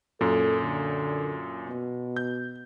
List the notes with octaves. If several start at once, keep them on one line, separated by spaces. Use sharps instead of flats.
F#2 A#2 A4
D3
B2
G6